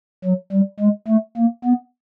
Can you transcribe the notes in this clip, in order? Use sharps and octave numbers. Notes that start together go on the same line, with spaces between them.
F#3
G3
G#3
A3
A#3
B3